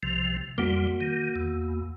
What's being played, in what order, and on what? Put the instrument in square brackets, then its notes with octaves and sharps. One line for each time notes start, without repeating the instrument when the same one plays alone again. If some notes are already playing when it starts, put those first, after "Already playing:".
[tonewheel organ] C2 C3 F3
[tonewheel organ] F2 G3 [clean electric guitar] A#3 F#4
[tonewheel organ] D#3
E2